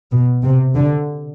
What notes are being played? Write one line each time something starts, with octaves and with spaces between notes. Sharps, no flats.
B2
C3
D3